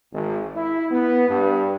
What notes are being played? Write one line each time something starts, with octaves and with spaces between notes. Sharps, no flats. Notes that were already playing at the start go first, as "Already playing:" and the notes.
G#1
E4
B3
G2